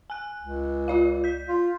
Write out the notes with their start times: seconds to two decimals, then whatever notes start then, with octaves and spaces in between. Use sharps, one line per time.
0.10 G#5 F#6
0.41 C#2
0.88 F4 D5 F5
1.24 G6 B6
1.48 F4